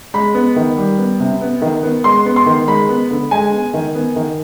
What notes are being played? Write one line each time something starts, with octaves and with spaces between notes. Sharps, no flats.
G#3 B5
B3
D#3
G3
B3
C3
B3
D#3
B3
G#3 C6
B3
C6
D#3
G#3 B5
B3
D3
G#3 G#5
B3
D#3
B3
D#3